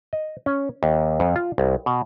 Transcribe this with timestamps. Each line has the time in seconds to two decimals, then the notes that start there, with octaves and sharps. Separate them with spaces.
0.13 D#5
0.46 C#4
0.83 D#2
1.20 F2
1.36 F4
1.58 C2
1.86 B2